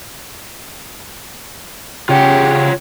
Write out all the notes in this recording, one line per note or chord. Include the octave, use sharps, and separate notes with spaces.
C#3 F4 G4 C#5 F#5